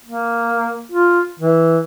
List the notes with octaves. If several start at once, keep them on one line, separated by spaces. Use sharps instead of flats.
A#3
F4
E3